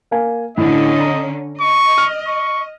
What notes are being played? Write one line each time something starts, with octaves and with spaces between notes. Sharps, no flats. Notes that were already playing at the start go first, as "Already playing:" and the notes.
A#3 F5 G#5
A2 D3 C#4 D#5
A#5
D#5 C#6
F6
C#6